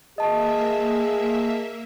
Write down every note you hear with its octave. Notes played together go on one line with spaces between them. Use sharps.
A#3 G#4 D#5 E5 A5